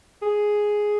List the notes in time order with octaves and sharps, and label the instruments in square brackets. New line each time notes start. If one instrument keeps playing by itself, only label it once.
[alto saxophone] G#4